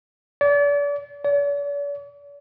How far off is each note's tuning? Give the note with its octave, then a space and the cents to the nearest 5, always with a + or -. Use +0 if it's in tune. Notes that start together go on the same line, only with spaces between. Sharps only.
D5 -35
D5 -45